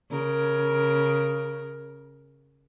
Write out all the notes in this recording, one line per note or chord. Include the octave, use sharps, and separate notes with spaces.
C#3 A#4